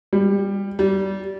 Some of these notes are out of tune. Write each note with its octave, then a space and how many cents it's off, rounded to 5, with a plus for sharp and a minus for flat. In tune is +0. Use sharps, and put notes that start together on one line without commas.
G3 +20
G3 -20